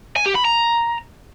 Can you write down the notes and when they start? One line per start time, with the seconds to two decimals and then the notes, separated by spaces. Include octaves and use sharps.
0.16 G#5
0.26 G4
0.35 B5
0.45 A#5